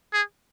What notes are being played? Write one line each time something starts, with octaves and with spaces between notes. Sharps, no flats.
G#4